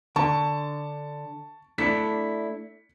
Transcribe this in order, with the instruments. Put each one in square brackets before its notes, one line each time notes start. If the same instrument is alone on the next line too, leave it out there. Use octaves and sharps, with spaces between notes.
[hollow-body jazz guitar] D3 [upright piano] A5 C#6
[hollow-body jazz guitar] A3 D4 E4 [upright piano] B6 C#7